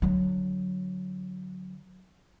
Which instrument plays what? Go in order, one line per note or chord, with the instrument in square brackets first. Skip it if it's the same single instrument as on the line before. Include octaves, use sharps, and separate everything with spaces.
[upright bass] D3 F#3